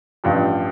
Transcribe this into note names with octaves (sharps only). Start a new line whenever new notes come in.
A1 G2 F3